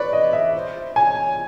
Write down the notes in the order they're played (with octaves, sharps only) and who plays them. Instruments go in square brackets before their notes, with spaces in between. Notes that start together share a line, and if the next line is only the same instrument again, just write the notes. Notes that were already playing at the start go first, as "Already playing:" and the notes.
Already playing: [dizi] B4 [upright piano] C#5 D5
[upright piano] D#5
E5
[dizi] C5
[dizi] C#5 [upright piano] G#5